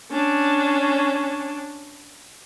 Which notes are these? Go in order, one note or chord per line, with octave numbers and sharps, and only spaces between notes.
C#4 D4